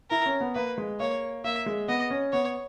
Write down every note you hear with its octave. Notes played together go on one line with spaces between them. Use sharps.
E4 A#4
C#4
B3
A#3 B4
G#3
A#3 C#5
A#3 E5
G#3
B3 D#5
C#4
B3 C#5